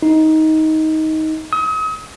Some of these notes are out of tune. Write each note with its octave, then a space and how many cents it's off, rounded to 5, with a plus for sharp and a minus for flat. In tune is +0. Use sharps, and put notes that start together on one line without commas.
D#4 +15
D#6 +40